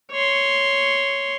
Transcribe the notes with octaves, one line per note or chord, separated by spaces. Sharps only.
C#5 C6